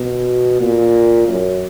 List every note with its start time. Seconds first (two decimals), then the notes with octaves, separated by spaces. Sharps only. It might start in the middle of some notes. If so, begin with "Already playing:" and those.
Already playing: B2
0.61 A#2
1.28 F#2